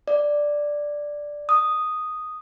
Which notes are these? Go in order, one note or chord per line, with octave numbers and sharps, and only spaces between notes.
D5
D#6